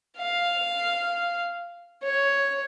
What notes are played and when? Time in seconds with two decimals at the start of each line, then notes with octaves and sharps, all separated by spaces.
0.18 F5
2.03 C#5